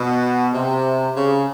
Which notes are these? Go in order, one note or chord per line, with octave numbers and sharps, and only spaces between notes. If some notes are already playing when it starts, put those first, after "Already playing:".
Already playing: B2
C3
C#3